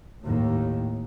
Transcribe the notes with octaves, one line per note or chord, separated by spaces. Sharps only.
D#2 A2